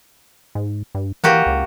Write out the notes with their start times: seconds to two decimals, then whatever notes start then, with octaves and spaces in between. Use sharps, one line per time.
0.55 G#2
0.95 G2
1.24 E3 A#3 F#4 G4
1.46 C#2